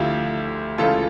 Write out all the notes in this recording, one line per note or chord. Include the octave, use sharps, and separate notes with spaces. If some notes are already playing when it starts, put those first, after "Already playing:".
Already playing: D2 D3 F3 E4 F4 G4
C#2 C#3 E3 F4 A4